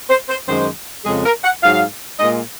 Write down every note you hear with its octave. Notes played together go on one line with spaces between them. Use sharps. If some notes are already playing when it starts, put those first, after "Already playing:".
C5
C5
F#2 D#3 G#3 C5
F2 C#3 G#3 G#4
A#4
F#5
G#2 F#3 F5
A#2 G#3 D#5